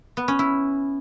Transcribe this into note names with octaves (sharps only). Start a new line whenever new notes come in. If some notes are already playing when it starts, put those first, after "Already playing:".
B3
C#4
E4